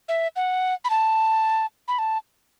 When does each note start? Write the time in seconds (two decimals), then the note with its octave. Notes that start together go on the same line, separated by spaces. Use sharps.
0.09 E5
0.36 F#5
0.85 B5
0.90 A5
1.88 B5
1.99 A5